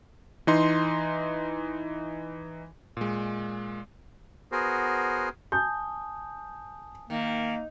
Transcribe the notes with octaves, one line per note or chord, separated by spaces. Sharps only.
E3 D#4 C6
A#2 G#3
B3 F#4 G#4 A#4 C5
G#5 A5 D#6 G6
D#3 A#3